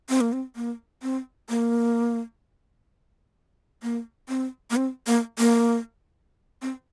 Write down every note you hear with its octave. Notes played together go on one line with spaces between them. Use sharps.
C4
A#3
C4
A#3
C4
A#3
A#3
C4
A#3
C4
A#3
A#3
C4